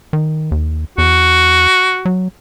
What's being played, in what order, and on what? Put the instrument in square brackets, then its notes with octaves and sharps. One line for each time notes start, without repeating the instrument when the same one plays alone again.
[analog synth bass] D#3
D#2
[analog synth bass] E2 [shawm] F#4
[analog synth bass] F#3